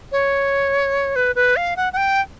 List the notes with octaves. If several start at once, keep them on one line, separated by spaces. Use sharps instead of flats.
C#5
B4
B4
F5
F#5
F#5
G5